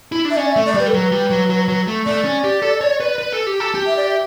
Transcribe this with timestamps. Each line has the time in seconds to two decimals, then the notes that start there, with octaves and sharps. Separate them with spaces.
0.12 E4
0.25 D4
0.31 E5
0.36 C#4 D5
0.51 E5
0.56 A3
0.66 D5
0.74 G3
0.79 B4
0.88 A4
0.94 F#3 B4
1.12 G3
1.30 F#3
1.50 F#3
1.68 F#3
1.87 A3
2.06 A3 D5
2.24 C#4
2.44 G4
2.62 A4
2.81 C#5
3.00 B4
3.18 B4
3.33 A4
3.47 G4
3.60 A4
3.75 G4
3.86 E5
3.97 D5
4.07 E5